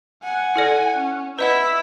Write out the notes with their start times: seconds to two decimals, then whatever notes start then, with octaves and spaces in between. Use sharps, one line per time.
0.24 F#5 G#5
0.56 E4 A4 D5
0.97 C#4
1.39 E4 B4 D#5 F#5 E6 B6